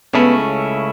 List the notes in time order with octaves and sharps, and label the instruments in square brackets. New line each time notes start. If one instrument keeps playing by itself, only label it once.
[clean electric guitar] C#2 C#3 A3 C#4 E4 [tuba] B3